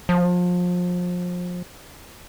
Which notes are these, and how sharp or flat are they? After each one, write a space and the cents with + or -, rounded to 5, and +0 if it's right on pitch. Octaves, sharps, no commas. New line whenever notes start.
F3 +30